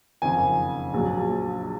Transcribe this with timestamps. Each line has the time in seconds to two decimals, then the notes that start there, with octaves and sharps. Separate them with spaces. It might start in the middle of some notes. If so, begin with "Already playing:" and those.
0.22 F#1 F2 D#3 G#5
0.93 A#1 A#2 F#3